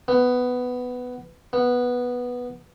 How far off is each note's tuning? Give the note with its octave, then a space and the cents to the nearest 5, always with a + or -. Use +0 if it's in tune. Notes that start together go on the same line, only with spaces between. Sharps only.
B3 +10
B3 -5